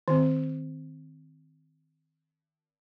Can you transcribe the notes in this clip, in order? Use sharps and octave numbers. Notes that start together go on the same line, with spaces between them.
D#3 C4